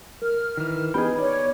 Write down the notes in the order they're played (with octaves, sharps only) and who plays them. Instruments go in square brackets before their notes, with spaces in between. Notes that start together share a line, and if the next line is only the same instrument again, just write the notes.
[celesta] A#4 [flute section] F6
[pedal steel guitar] D#3 E3
[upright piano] B3 D#4 [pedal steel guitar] G#4 G5 [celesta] B5
[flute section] C#5 [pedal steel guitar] D5